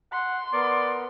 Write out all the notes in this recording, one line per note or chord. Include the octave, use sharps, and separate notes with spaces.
F#5 C6
B3 A#4 D5